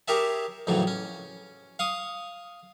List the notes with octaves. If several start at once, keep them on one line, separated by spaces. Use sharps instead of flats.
G4 G#4 A#4 C#5 E5 A5
F2 A2 C#3 E3 F#3
C#4
F5 C#6 D#6